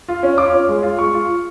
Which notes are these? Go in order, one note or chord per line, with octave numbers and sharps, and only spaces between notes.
F4
C#4
F4 D6
C#4
G#3
F4
G#3 C#6
F4